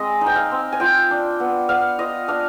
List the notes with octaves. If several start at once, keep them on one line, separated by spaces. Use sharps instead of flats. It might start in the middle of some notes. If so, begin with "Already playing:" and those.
Already playing: G#3 C4 D#5
D#4
G5
F5
C4
G#5
F4 G5
D4
B3
B3 F5
F4 D#5
D4 F5